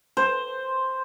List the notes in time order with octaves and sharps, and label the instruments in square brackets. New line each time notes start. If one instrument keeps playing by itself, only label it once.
[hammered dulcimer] C5